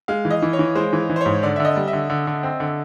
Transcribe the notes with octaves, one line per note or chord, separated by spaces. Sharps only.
G#3 F5
E3
D#5
E3
C#5
E3
G#3 C5
E3
E3
C5
G#2 C#5
D3 D5
E5
D3
D#5
G3
E5
D3
D3
D3
C4
D3